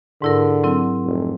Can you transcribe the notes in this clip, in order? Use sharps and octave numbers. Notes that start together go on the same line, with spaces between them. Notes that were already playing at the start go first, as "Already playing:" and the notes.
G#2 D3 E4 A#4
F#3 C4 E4
F1